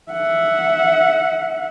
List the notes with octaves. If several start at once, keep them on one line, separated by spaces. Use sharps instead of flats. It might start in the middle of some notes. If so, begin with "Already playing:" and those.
E5 F#5